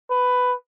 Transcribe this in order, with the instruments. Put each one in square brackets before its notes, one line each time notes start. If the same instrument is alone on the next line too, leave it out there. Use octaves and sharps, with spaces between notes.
[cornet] B4